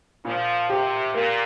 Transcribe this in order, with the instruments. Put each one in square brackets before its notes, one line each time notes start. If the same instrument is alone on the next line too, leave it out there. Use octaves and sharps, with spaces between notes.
[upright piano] A#2 [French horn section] F3
[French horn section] C3 [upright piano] G4
[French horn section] A#2 [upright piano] A#3